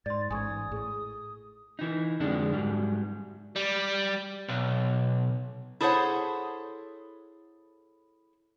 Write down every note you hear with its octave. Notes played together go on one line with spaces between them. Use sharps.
G#2 D5 C6 A6
A1 G#2 G#5 C#6 D#6 G#6
A2 G#4
E3 D#4
F2 D3 G#3 D4
G#2 F#3 G3
G3
B1
E4 G#4 A4 C5 C#5 F#5